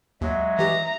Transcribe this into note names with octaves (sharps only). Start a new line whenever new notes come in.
D#2 F#3 G#3 E5
E3 G4 A#5